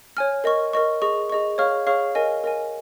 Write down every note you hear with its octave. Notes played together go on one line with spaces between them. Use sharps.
C#5 G#5 F6
A#4 D#5 C#6
A#4 D#5 C#6
G#4 D#5 C#6
G#4 D#5 C#6
G#4 C#5 F5 C#6 F6
G#4 C#5 F5 C#6 F6
A#4 D#5 G#5
A#4 D#5 G#5